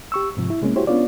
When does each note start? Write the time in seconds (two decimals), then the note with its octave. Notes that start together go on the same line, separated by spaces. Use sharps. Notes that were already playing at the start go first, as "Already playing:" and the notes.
0.12 G4 C#6 E6
0.37 G#2 C3 F3
0.50 E4
0.62 C3 G#3 A#3 C#4
0.76 E4 F#4 G4 C5 C#5
0.87 B3 C#4 D4 F4 C#5 D5